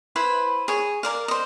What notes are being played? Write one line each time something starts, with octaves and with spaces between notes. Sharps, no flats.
E4 B4 C5 B5
G#4 C#5
A#4 D5 F5
C5 D#5